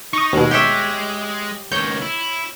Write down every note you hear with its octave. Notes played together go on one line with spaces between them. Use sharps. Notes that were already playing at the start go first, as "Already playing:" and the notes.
D#4 C#6 D#6
D#2 B2 G#3
G4 C#5 E5
C#2 D#3 C#5 G6
E4